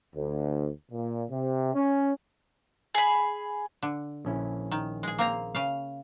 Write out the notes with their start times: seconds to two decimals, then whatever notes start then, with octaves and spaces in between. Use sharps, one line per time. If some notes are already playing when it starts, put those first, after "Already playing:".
0.15 D2
0.91 A#2
1.30 C3
1.75 C#4
2.95 G#4 B5
3.83 D3
4.25 A#1 C#4 E4
4.72 D#3
5.03 G#3 G#4
5.19 A#3 C4 A#5
5.55 C#3 F5